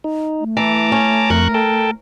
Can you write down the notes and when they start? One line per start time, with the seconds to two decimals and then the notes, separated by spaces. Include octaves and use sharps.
0.04 D#4
0.40 A3
0.57 E3 A5 A#5 D6
0.92 C#4
1.30 F2 A#4 C#6 F#6
1.54 A4 G5 A5